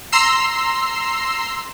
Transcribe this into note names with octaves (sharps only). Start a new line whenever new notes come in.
A#5 C6 E6 C7